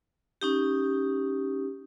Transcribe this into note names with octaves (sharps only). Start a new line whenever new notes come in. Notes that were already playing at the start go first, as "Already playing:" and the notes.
C#4 D#4 G4